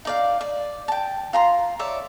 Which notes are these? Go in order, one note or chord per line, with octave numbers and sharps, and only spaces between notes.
D#4 D5 F5
D5
G5 A5
F4 A#5 C6
C#5 D5 E5